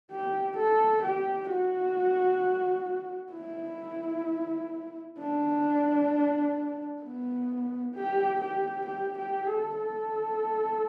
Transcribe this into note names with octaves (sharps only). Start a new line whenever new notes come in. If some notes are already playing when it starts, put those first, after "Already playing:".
G4
A4
G4
F#4
E4
D4
B3
G4
G4
G4
G4
A4
A4